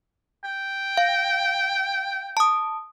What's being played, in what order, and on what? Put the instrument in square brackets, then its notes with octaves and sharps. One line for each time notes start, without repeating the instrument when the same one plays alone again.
[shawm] G5
[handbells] F5
A5 D#6